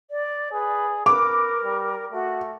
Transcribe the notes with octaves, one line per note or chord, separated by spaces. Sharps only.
D5
G#4 B4
A#4 B4 D6
G3
A3 F#4